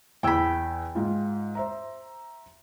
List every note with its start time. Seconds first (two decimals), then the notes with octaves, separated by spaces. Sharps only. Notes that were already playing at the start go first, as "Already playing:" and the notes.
0.23 E2 G5 B5 E6 G#6
0.95 G#2 F4
1.55 C5 E5 A#5